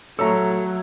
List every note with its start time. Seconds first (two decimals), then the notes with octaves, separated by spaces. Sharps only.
0.19 F#3 A3 A4 C#5 A#5 E6